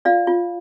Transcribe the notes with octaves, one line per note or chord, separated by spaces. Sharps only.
F4 D5 F5
F4